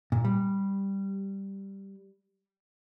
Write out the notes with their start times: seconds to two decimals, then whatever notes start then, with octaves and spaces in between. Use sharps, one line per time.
0.12 A#2
0.25 G3